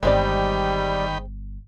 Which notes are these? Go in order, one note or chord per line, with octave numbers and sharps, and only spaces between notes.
G1 D#3 G3 G#3 C4 D5 G5 B5